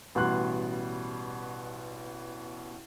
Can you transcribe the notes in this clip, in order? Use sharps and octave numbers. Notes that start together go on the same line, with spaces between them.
A1 B2 G3 F#4 C6 F#6